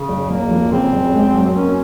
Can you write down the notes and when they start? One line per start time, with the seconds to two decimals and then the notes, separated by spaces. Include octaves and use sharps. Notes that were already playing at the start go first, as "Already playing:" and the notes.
Already playing: C#3
0.09 F#1
0.30 F#1 A#3
0.51 F2
0.72 C#3 C4
0.92 F#1
1.14 G#3
1.34 F#2
1.56 A#3 C#4